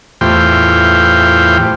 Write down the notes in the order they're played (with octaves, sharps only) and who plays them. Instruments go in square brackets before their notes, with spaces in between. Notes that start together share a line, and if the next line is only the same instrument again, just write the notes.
[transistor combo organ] E2 A2 F4 G4 C5 G5